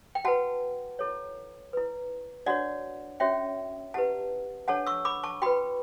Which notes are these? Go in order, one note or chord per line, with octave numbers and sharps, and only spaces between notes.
G5
F#4 B4 F#5 A5
E4 A4 C#5
E4 B4
D4 F#4 C#5 D5 F#5
C#4 F#4 C#5 E5 G5
E4 G4 B4 F#5 A5
D4 A4 C#5 F#5 A5
C#6 E6
B5 D6
A5 C#6
F#4 B4 G5 B5